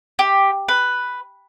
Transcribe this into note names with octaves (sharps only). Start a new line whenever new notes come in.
G4
B4